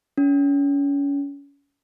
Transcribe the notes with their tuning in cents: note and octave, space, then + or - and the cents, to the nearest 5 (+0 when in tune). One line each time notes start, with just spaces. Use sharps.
C#4 +30